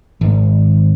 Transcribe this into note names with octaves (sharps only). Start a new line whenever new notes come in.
G#1